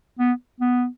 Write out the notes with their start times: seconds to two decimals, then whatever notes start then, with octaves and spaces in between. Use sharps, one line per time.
0.19 B3
0.60 B3